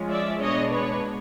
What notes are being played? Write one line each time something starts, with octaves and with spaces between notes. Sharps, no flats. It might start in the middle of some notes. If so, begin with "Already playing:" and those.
Already playing: F3 G#3 C#4
D5 E5
B2 G#3 B3 D4 C#5 D#5
B4 C#5